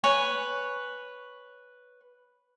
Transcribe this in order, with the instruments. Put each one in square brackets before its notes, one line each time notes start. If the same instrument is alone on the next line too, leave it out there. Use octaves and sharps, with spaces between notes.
[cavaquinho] B4 C#5 G#5